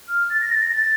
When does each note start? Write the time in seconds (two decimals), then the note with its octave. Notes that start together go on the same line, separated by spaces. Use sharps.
0.08 F6
0.30 A6
0.41 A#6
0.51 A6
0.62 A#6
0.73 A6